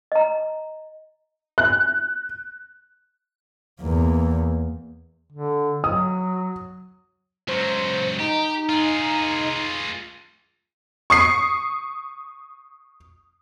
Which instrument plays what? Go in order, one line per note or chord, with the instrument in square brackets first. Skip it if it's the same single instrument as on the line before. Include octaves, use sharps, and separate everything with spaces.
[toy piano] D#5 A#5
[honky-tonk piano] F#6
[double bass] E2 A#3
[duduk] D3
[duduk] F#3 [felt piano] D#6
[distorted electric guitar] C#2 F#3 [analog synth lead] C5
[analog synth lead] D#4 [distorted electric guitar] G4
[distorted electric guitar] F4 G#4
[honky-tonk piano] C#6 D#6 C7